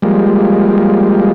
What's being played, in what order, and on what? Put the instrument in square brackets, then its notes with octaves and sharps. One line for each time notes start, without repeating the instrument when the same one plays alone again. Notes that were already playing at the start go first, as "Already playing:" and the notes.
[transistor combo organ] F3 G3 G#3 A#3